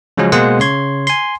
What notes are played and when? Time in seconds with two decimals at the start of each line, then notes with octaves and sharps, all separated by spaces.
0.17 C#3 F3 F#3 G#3 C#4
0.32 B2 G#3 A#3 C5 F#5 D#6
0.59 C#3 C#5 C6 G#6
1.07 G#5 C6